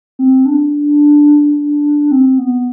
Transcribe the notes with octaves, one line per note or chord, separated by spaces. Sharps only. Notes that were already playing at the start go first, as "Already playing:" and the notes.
C4
D4
C4
B3